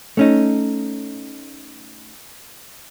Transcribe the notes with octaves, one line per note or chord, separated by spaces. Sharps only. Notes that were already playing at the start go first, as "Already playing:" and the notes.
A3 C#4 D#4